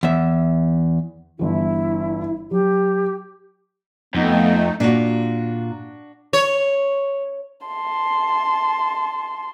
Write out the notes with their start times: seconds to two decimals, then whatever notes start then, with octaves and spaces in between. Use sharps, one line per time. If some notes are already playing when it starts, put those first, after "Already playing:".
0.03 E2 E5
1.39 G1 E3 E4
2.51 F#3 G4
4.15 F2 A3 B3 D#4
4.80 A#2 D4 F#4
6.33 C#5
7.67 A5 C6